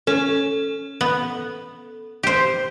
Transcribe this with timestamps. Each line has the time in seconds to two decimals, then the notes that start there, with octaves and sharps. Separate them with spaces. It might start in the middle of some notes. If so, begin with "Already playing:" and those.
0.07 C#4 A4
1.01 B3
2.23 G4 C5